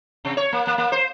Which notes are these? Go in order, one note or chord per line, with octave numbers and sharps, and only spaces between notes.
C3
C#5
A#3
A#3
A#3
C5